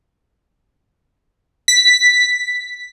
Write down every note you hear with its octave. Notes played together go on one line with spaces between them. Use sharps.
B6